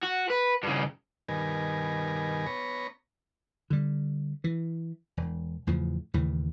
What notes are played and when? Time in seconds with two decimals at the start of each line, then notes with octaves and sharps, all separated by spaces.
0.04 F#4
0.30 B4
0.63 G2 C#3
1.29 G2 B2 D#3 A#4 G#5
2.46 B3 C#5 A#5
3.70 D3 G3
4.44 E3
5.17 E1
5.67 E2 A2 C#3 F3
6.14 D#2 A2 C#3 E3